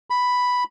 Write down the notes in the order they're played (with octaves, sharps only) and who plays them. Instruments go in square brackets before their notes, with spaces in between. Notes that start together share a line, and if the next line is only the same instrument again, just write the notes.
[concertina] B5